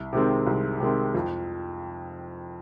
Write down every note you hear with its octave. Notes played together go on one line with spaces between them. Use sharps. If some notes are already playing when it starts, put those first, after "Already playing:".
Already playing: C2
C3 D#3 G#3 C4
C2
C3 D#3 G#3 C4
F2